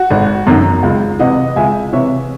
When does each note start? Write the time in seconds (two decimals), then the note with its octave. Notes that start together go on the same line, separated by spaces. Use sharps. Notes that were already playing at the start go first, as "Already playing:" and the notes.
Already playing: F#4
0.10 G#1
0.47 F#2 D#3
0.83 C#2
1.19 C3 E3 D#5 F#5
1.56 C#2 E5 G#5
1.93 C3 E3 C#5 E5